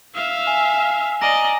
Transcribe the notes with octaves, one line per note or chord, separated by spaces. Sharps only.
E5 F5
G#5
D5 D#5 G#5 A#5 A#6